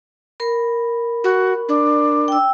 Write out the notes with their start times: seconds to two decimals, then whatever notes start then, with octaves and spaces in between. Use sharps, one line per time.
0.40 A#4 B5
1.24 F#4
1.69 D4
2.28 G5 E6